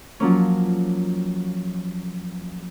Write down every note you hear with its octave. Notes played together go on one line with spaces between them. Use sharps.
F3 F#3 A#3 C#4